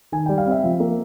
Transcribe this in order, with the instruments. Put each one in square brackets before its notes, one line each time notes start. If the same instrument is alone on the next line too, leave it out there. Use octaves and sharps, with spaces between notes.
[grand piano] D#3 G#5
G3 G5
F5
C4 E5
F3
A#3